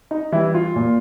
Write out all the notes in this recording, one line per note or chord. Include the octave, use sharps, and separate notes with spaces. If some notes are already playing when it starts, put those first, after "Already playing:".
D#4
E3 G3 E4
F4
A#2